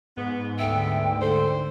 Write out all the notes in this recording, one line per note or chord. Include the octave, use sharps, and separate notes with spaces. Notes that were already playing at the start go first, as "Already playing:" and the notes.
G#2 B3
D2 D3 B3 A4 E5 G5
A4 C5